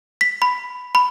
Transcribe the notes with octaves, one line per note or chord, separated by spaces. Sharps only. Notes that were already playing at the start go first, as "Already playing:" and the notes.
B6
B5
B5